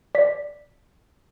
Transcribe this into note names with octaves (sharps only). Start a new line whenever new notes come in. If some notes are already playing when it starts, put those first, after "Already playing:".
D5 B6